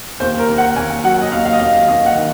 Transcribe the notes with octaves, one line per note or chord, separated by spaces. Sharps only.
D#2 C5
A#4
D#2
F#5
D#2 G#5
F#3 F#5
D#5
D#2 F5
F5
D#5
D#2 F5
F5
D#2 D#5
F#5
D#3